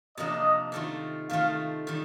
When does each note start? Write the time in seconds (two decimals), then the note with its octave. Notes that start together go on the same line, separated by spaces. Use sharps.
0.18 C3 F3 A#3 D4 D#5
0.72 D#3 A3 C4 F4
1.29 D#3 A3 C4 F4 F5
1.87 D#3 G3